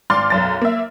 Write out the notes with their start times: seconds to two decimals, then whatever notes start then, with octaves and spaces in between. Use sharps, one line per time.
0.10 G#1 C6 D6 F6 A6
0.30 B1 F#2 A6
0.61 A#3 E5